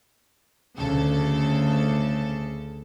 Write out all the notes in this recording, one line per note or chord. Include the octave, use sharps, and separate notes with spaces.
D2 C#3 A4